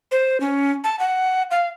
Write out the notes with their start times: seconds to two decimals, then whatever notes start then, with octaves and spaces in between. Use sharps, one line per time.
0.11 C5
0.41 C#4
0.84 A5
0.99 F#5
1.51 F5